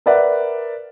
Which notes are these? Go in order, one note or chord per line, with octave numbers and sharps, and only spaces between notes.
A#4 B4 D5 E5 F#5